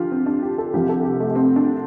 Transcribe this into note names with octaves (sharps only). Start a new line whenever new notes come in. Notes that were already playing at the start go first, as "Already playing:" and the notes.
Already playing: D3 F3 F4 G4
C4
D4
G4
A4
C2 C3 F3 G4
A4
G4
A3
A3
C4
D4